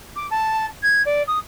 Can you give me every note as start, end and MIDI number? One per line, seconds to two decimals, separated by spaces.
0.16 0.27 86
0.30 0.65 81
0.82 1.02 92
1.05 1.22 74
1.27 1.38 87